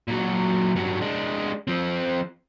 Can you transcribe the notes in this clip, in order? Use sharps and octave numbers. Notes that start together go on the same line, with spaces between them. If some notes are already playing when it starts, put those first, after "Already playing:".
A#2 F#3
G2 F#3
G#3 D4
F3 C4